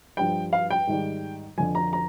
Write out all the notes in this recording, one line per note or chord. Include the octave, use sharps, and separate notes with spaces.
G2 F3 G5
F5
G5
G#2 D#3 G3
F2 D3 F3 G#5
A#5
A#5